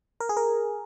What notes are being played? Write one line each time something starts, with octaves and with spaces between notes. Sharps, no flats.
A#4
G#4
A#4